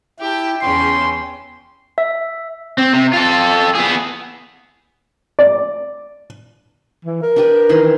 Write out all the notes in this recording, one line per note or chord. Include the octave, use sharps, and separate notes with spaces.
E4 G4 G5 A5
E2 C#3 G5 C6
E5
C4
C3
F4 A4
B3 G#4
D5
E3
A#4
D4 G4 B4
D#3 E3 C6